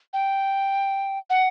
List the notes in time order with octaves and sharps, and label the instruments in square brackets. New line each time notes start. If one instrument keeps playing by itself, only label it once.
[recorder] G5
F#5